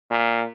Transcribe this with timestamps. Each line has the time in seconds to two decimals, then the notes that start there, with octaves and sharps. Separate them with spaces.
0.11 A#2